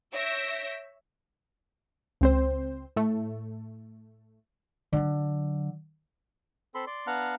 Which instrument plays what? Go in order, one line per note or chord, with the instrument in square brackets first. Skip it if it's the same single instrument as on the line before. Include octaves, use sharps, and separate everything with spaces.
[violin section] C#5 E5 E6 G6 A#6 D7
[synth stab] C#2 C4 C5
A2 A3
[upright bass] D3 F#3
[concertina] C4 A4 B5 C6
D5 C6
B3 D4 F5 F#5 A#5